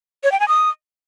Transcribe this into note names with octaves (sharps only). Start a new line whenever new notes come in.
C#5
G5
G#5
D#6